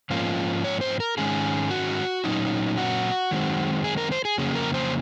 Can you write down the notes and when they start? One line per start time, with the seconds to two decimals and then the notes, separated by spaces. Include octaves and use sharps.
0.10 G#2 F3 A#3 C#4 F4
0.64 C#5
0.81 C5
1.00 A#4
1.18 G#2 D#3 G#3 C#4 G#4
1.71 F#4
2.24 A#2 F#3 C#4 D#4
2.77 F#4
3.31 F#2 D#3 G#3 C4
3.84 G#4
3.98 A#4
4.12 C5
4.25 G#4
4.38 F2 C#3 F#3 A#3 C#4 G#4
4.55 A#4
4.74 C5